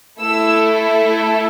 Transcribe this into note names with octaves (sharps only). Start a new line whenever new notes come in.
A3 E4 A4 E6